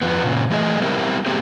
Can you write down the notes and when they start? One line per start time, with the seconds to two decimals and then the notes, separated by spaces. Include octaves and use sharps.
0.02 F2 F3 B3
0.24 A#2 C#3
0.50 E3 A3 G#4 D#5
0.80 G3 B3 C4 E4 G4 A#4
1.26 A3 B3 C4 G4 G#4